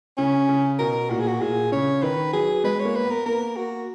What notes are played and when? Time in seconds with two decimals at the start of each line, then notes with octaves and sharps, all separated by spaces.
0.18 C#3 C#4
0.49 C#3
0.79 B2 A#4
1.10 A#2 F#4
1.20 G#4
1.28 F#4
1.41 A#2 G#4
1.72 C#3 C#5
2.03 D#3 B4
2.33 F#3 G#4
2.64 G#3 B4
2.80 A#3 C#5
2.96 B4
3.05 B3
3.10 A#4
3.26 A#3 A#4
3.56 F#4